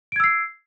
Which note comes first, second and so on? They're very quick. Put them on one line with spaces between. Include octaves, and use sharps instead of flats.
D7 G#6 E6 C7